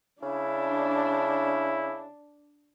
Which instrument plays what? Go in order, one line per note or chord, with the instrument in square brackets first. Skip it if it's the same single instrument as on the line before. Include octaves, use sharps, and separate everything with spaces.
[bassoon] C#3 [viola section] D4 [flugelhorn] E4